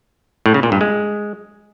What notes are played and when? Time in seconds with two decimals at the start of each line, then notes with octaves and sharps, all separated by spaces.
0.46 A2
0.54 C#3
0.63 A#2
0.72 G2
0.81 G#3